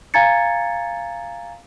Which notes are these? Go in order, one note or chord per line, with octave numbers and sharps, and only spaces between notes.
F5 G#5 A#5 G#6 A6 C#7